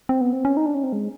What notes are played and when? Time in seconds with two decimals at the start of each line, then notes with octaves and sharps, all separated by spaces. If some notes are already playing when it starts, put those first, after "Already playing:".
0.09 C4
0.21 B3
0.33 C4
0.45 C#4
0.57 D#4
0.66 D4
0.74 C#4
0.83 C4
0.93 G#3